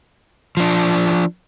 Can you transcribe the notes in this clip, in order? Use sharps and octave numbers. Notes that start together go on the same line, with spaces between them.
F3 D4